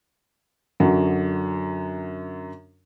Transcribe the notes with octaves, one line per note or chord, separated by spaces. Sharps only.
F#2 D3 F#3